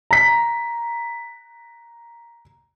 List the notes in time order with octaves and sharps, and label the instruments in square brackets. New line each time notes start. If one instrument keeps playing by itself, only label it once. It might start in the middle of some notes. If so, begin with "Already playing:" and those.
[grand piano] A#5 B6